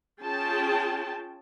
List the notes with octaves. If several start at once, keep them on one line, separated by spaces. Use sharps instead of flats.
C#4 F4 G#4 G5 A5